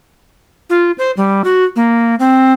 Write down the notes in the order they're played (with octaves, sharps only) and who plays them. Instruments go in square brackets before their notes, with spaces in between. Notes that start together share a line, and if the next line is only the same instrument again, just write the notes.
[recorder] F4
C5
G3
F#4
A#3
C4